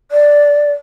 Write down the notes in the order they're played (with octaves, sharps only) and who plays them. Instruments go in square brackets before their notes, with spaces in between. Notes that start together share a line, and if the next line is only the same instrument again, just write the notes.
[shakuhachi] D5